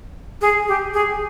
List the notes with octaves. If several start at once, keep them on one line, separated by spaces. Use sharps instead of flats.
G#4
G4
G#4